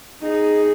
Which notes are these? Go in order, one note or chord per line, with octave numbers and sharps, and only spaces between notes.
D#4 G#4